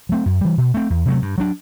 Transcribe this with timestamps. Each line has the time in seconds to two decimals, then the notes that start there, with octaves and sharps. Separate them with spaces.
0.09 F#3 A3 C4
0.26 F#2
0.41 E3 G3
0.58 B2
0.74 A3 C4
0.90 E2
1.06 C3 F#3 A3
1.22 G2
1.38 F#3 A3 D4